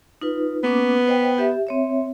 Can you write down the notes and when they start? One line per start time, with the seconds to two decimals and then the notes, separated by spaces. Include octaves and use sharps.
0.22 D#4 F4 B4
0.63 A#3 B3 C#4 D6
1.07 C5 D#5 G5
1.38 G4 E5
1.67 C4 C#5 E5